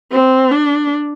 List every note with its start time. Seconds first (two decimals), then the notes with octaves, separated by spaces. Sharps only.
0.12 C4
0.51 D4